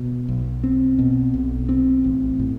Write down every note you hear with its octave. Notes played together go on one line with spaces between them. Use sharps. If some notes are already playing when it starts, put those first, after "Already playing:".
Already playing: B2
B1
C4
B2
B1
C4
A1
A2